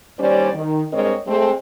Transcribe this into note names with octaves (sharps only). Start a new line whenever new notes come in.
D#2 G3 C#4 C5 D5
D#3
G2 G#3 C4 A#4 C#5 D#5
G#3 A3 C4